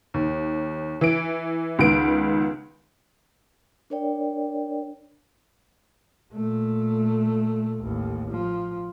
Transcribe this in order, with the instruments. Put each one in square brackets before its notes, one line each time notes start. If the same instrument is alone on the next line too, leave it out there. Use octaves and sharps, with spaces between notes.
[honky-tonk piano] D#2
E3 D7
C#2 D#3 B3 D7
[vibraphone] D4 A#4 C#5 D5 G5
[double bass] A#2 A3
A1 D#2
F3